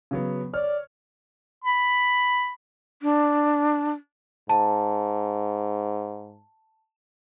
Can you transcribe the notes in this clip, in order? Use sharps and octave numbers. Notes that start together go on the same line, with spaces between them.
C#3 F#3 B3
C#5 D5 F6
B5
D4
G#2 A5